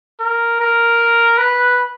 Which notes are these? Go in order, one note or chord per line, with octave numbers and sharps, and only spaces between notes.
A#4
A#4
B4